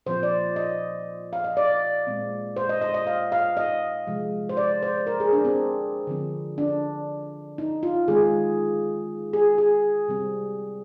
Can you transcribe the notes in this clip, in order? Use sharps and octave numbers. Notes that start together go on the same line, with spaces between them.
A#2 F3 C4 C5
D5
D#5
F5
D#5
D5
A#2 G#3 C4
C5
D#5
D#5
D#5
F5
F5
D#5
C3 F3 G#3
C5
D5
C5
A#4
G#4
D4
C4
D3 F3 C4
D4
D#4
F4
D#3 G#3 C4 G#4
G#4
G#4
C3 G3 C4